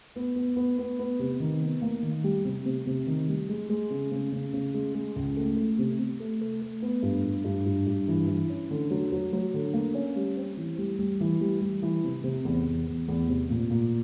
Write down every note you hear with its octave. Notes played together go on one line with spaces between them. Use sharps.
B3
B3
B3
B3
B3
C3
D#3
B3
A#3
D#3
G3
C3
C3
C3
D#3
G3
G#3
G#3
C#3
C#3
C#3
C#3
G#3
G#3
C#2
A3
A3
C3
C3
A3
A3
A3
B3
G2
G2
G2
G2
G2
E3
E3
C#4
D3
F#3
F#3
F#3
D3
A#3
C#4
G3
C4
E3
G3
G3
E3
G3
G3
E3
C3
C3
E2
E2
E2
E2
C3
A#2
A#2